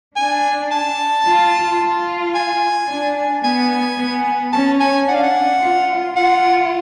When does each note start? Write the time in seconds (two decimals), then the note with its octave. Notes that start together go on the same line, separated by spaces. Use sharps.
0.16 D4 G#5
0.71 A5
1.26 F4
1.80 F4
2.35 G#5
2.89 D4
3.43 B3 G#5
3.98 B3
4.53 C#4 A5
4.80 G#5
5.07 D4 F#5
5.15 F5
5.23 F#5
5.62 F4
6.16 F4 F#5